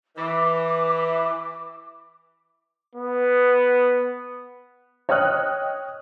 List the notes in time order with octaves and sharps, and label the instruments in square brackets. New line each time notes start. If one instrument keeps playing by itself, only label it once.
[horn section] E3 [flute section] D6
[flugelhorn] B3
[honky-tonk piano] C#5 D#5 G5 D#6 F6 F#6